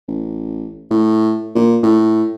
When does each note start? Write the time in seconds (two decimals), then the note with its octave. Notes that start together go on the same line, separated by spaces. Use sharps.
0.08 A1
0.91 A2
1.55 A#2
1.83 A2